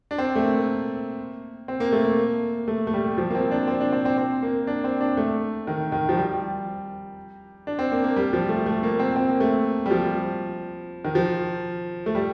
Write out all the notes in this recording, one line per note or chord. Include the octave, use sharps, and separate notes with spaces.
D4
C4
A3
A#3
C4
A#3
A3
A#3
A3
A3
G3
F3
A#3
C4
D4
C4
D4
C4
C4
C4
A#3
D4
C4
D4
A3
D#3
D#3
F3
G3
D4
C4
A#3
A#3
G3
F3
A3
A3
A#3
C4
C4
A#3
A3
G3
F3
D#3
F3
A3
G3